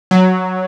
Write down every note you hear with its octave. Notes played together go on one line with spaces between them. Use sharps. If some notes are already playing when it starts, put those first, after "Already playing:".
F#3